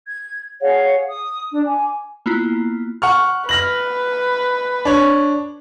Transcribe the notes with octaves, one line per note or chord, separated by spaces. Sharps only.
G#6
G#4 C#5 F5 F#5
D#6
D4
G#5 D6
A#3 B3 E4 F4
F#5 C#6 F6
B4 F6 A#6 F#7
D4 C#5